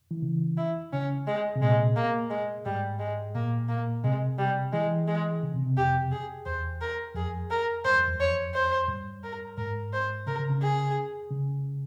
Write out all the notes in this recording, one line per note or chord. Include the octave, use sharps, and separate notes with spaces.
E3
C#3
E4
C#3 C#4
G#3
C3
A#2 G#3
A#3
G#3
G#2 G3
G#3
A#2 A#3
A#3
C3 G#3
G3
E3 G#3
G#3
C#3
C3
C3
F2 G4
G#4
E2 C5
A#4
F2 G#4
A#4
G2 C5
F2
E2
F2 C#5
C5
G2
A#4
G#2 A#4
C5
C#3 A#4
C#3
C#3
C#3 G#4
C#3